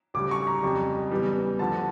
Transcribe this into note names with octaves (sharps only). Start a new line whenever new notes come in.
D2 C#3 G3 D6
C#6
A#5
F2 C#3 G3
E2 C#3 E3 G3
D2 D3 F3 A5